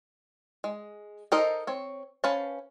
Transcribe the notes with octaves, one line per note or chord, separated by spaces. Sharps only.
G#3
D#4 A4 A#4 C5 D#5
C4 C#5
C#4 B4 C5 F5 A5